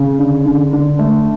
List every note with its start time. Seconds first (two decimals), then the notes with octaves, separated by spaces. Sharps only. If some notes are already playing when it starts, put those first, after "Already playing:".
Already playing: C#3
0.19 D3
0.45 D3
0.73 D3
0.99 A3